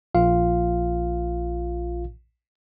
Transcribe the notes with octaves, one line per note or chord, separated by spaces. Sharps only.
A#1 F4 F5